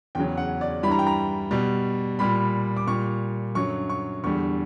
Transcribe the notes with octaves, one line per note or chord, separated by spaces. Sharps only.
E2 C#3 F#3 G5
F#5
D5
G2 E3 G3 B5
A#5
G5
A#5
B2 G3
A#2 G3 B5
D6
A#2 G3 C#6
F#2 D3 F#3 C#6
C#6
E2 D3 G3 C#6